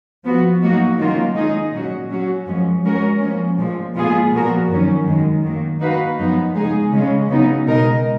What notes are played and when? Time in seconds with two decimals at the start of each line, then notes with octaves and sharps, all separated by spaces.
0.24 F3 B3 F#4
0.61 F#3 A#3 D#4 F#4
0.98 D#3 F#3 A#3 C#4 F4
1.35 G#3 D#4 G#4 D#5
1.73 A#2 F#3 C#4 F#4
2.10 F#3 C#4 F#4
2.46 F#2 F3 G#3 C#4
2.84 G#3 C#4 F#4 A#4
3.21 F3 A#3 C#4
3.58 A#2 F3 G#3
3.94 A#2 G#3 B3 F4 G#4
4.32 A#2 F3 B3 F#4 A#4
4.69 F#2 D#3 F#3 C#4
5.06 F#2 D#3 G#3
5.44 D#3 F#3 A#3
5.80 A#3 D#4 F#4 B4 F5
6.18 F#2 F3 G#3 B3 D#4
6.55 C#3 G#3 D#4 G#4
6.92 C#3 G#3 C#4
7.29 C#3 F#3 B3 D#4
7.66 B2 G#3 D#4 A#4 D#5